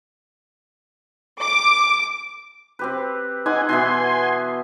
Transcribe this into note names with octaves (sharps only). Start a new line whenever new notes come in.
D6
C4 G4 B4
D#4 F#5 G#5 C6 D6
B2 E3 B3 G#5 C6